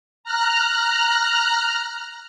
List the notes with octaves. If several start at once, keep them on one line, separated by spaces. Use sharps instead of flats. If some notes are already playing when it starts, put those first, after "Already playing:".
A#5 F6 F#6